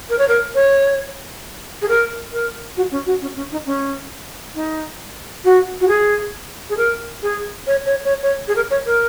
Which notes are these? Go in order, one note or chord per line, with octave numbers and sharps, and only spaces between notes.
A#4
C#5
A#4
C#5
G#4
A#4
A#4
F#4
C#4
F#4
C#4
C#4
D#4
C#4
D#4
F#4
F#4
G#4
G#4
A#4
G#4
C#5
C#5
C#5
C#5
G#4
A#4
C#5
A#4